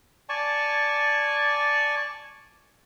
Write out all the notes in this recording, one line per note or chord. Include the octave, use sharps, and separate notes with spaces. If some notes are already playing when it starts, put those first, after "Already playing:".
D5 G#5 A5 C#6